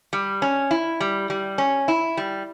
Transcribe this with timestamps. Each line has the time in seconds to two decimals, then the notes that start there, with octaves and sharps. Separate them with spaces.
0.13 G3
0.42 C#4
0.71 E4
1.00 G3
1.30 G3
1.58 C#4
1.88 E4
2.17 G3